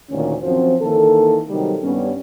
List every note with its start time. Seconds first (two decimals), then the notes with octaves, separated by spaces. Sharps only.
0.10 D2 A#2 D#3 C#4
0.43 F#2 F3 C4 C#4 F#4 C5
0.81 D#3 E3 A#3 A4
1.50 C3 D#3 F#3 G3
1.84 G2 G3 B3 C#4